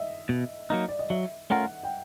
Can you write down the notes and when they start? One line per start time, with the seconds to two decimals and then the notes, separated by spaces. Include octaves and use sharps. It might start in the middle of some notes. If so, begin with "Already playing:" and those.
Already playing: D#5 E5
0.29 B2
0.70 F#3 A#3 D#4
0.88 D5
0.99 D#5
1.10 F#3 E5
1.50 A3 C#4 F4 A#4 F#5
1.83 G5